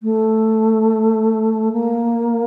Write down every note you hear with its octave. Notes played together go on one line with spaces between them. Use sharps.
A3
A#3